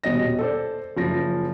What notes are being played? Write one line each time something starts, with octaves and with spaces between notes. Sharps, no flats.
D#1 B2 D#5 A#6
A4 C5 D5
F#1 F3 A#6